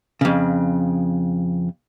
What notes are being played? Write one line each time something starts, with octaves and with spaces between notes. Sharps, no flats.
F2 C#3